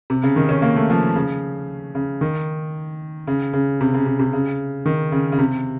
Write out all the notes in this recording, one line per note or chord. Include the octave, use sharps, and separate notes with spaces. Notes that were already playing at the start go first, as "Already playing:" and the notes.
C3
C#3
D#3
C#4
A#3
A3
F3
C#3
C#3
D#3
C#3
C#3
C3
C#3
C3
C3
C#3
D#3
C#3
C#3
C3